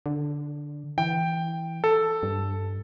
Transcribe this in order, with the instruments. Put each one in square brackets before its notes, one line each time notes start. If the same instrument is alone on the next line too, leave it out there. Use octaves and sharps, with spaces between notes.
[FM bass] D3
[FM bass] E3 [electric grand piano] G5
[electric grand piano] A4
[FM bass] G2